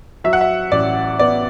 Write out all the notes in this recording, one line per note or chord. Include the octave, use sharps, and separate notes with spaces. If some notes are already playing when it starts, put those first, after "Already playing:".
F#3 E5
F#5
E5
A1 D5
B3 D5